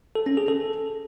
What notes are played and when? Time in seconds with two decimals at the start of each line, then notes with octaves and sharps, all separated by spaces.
0.15 A4
0.26 C#4
0.37 G#4
0.48 A4